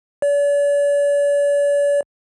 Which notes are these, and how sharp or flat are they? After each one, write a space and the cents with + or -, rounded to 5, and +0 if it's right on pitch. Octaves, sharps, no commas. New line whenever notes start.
D5 -45